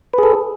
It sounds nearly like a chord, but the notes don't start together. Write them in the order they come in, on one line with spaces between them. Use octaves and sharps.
B4 G#4 A4